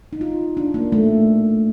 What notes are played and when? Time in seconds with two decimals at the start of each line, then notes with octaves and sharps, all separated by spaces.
0.13 D#4
0.21 F4
0.57 D4
0.74 A#3
0.92 A3